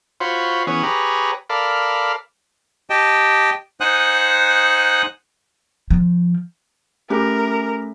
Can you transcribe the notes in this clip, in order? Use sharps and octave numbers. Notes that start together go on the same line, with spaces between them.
F4 F#4 C5 C#5 B5
E3 B3 C#4 G#4 C#5
G4 G#4 B4 C#5 A#5
A4 A#4 D5 F5 B5
G4 D#5 G5 A5
D#4 C5 F#5 G#5 D#6 F#6
F3
A3 C#4 G4 A#4 E5